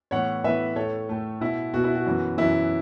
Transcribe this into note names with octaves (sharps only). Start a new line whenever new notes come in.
A2 E3 B3 C#5 F#5
A2 E3 B3 B4 E5
A2 A3 A4 C#5
A2 A3
B2 B3 E4
B2 B3 F#4
E4
F#4
F#2 E3 B3
F#2 E3 B3 E4